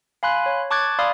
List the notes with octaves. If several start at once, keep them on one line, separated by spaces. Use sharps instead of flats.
F5 G#5 B5 C6 F#6
C#5
A5 C#6 D6 F#6 G#6 A6
D5 F5 B5 C6 D#6 F6